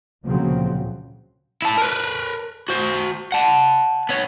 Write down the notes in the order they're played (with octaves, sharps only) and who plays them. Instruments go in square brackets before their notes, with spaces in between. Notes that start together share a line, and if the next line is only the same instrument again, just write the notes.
[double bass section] D2 A#2 C#3 F3 F#3 C4
[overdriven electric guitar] E4 A5
A#4 B4
F#4 C5
F#5 A5
B3 C#5